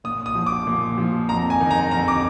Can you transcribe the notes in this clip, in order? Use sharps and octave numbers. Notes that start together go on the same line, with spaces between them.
A#2 D#6
D#6
F3
D6
A#2
F3
F2 A#5
G#5
D#3
A#5
F2 A#5
D6